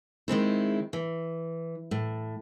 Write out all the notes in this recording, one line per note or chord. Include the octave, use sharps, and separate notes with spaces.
D#3 G#3 C4 E4
E3
A2